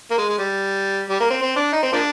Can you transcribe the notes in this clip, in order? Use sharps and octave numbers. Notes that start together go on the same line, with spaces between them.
A#3
G#3
G#3
G3
G3
A#3
C4
C4
D4
D#4
C4
F3 A#3 D4